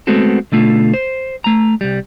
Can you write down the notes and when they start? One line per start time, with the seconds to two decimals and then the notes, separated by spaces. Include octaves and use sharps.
0.07 G#3 A3 B3 C4 F#4 A4
0.52 B2 D3 A3 F4
0.94 C5
1.44 A3 A#5
1.81 C2 G3